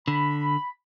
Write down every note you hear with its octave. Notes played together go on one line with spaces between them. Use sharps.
D3 B5